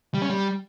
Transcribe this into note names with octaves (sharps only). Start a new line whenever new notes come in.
G3
C#4
G3